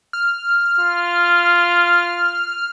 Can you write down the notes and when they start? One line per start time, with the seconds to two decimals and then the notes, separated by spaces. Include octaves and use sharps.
0.13 F6
0.80 F4